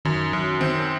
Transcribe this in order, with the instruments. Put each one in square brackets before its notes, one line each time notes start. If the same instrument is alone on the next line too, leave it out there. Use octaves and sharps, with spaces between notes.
[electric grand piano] F#2 [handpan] D#3
[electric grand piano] F#2 [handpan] F#3
[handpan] D#3 [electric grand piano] C4